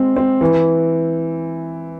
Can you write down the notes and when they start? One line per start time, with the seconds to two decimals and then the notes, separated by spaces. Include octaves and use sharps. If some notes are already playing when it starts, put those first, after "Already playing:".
Already playing: G#3 C4
0.16 C4
0.41 E3